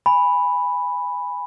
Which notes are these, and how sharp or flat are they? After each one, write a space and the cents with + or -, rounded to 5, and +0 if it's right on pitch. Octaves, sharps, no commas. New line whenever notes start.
G#5 -15 B5 +0